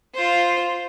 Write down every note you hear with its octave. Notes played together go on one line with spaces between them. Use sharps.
F4 C5